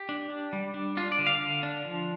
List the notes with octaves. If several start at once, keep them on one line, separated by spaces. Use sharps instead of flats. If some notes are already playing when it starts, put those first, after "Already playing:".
Already playing: G4
D4
D4
G3
D4
D4 F4
D5
D3
F5
D3
D4
F3